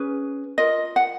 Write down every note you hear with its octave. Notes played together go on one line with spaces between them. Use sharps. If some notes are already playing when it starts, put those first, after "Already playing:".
Already playing: C#4 G#4 B4
F4 A#4 D#5
F#5